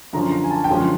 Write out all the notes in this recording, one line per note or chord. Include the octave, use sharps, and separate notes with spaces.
F#2 D3 F3 A#5
A#5
G#5
A5
G5
F#2 D3 F3 G#3 G#5